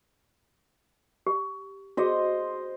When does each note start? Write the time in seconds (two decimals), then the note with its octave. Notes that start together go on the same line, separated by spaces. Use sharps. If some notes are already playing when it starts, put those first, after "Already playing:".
1.27 G4
1.97 F#4 G#4 C5 D#5